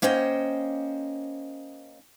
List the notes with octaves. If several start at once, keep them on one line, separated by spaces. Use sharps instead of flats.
A#3 C#4 C5 D#5 G5